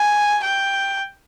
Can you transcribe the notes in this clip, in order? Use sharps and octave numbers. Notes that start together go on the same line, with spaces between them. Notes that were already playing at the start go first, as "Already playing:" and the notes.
Already playing: G#5
G5